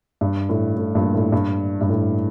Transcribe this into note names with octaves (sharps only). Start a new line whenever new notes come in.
G2
A2
A2
G2 A#2
A2
G2
G2
A2